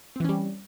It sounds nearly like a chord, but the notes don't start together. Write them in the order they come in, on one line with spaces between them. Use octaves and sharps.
C4 E3 C#4 G3